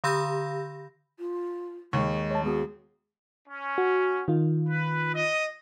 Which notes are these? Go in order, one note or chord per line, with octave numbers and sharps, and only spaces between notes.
D3 G4 B5 E6 G6 A#6
F4
D#2 G#3 C#6
C#5 A5
G#3 B3 F#4 G#4
C#4
F#4
D#3 F4
B4
D#5